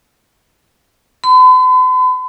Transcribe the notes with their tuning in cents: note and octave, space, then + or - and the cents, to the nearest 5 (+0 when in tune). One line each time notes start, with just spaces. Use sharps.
B5 +45